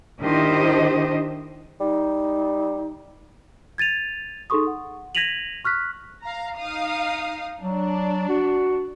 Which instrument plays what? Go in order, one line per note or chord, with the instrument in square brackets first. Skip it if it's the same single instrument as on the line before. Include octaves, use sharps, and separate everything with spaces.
[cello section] D#3 D4 E4 G4 C5 D#5
[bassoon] G3 [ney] D#4
[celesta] G#6 A6 D#7 F7
D#4 G#4 A4 C6 C#6 D#6
F#5
G#6 A#6 B6 D#7 F7 F#7
C#6 F6 F#6 B6
[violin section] F5 A#5
D#4 F5 D#6
[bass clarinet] F#3 [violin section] D4
[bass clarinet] F#4